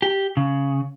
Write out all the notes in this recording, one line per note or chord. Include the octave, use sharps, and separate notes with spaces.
G4
C#3